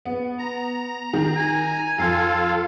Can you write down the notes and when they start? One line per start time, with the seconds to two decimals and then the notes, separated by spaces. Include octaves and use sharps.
0.05 B3
0.39 A#5
1.13 D#3
1.36 G#5
1.98 F2 F4 A4 F5